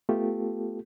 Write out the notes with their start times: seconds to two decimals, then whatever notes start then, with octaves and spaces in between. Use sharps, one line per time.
0.09 A3 B3 F4 G4 A4